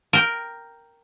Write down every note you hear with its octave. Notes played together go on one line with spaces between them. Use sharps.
A#4 G5